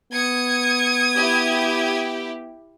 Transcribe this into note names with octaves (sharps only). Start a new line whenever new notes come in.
B3 D#6 G#6 C#7
E4 G4